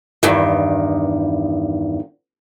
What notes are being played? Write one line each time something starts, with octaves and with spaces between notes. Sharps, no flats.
E2 G2 D#3